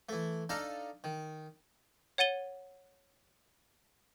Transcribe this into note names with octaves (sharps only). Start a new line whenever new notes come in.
E3 A3
D4 D#4 A4 F5 A5 A#5
D#3
C#5 F#5 A6 D#7 G7